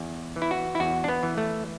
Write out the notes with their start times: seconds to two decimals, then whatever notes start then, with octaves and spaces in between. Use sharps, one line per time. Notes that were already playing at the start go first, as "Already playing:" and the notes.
Already playing: E2
0.36 E3
0.42 E4
0.51 F#4
0.75 E4
0.80 E2 F#4
1.04 D4
1.08 B3
1.23 E3
1.38 A3